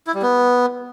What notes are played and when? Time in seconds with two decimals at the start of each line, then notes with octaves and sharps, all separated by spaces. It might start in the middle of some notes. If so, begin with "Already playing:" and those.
0.07 E4
0.15 G3
0.22 B3